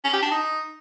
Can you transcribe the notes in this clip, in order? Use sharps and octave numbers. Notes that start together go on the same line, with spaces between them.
C#4
G4
D4
D#4